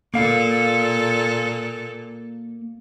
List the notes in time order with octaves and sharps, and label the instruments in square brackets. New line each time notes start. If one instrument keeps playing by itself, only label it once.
[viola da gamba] A#2 A4 [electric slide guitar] A#3 F5